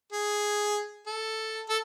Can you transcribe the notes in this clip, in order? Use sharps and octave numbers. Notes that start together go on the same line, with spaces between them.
G#4
A4
A4